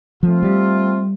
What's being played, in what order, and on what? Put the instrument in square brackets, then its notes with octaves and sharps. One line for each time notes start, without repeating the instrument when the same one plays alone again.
[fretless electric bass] F3 [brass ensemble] A3 C4 F4
[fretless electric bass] G3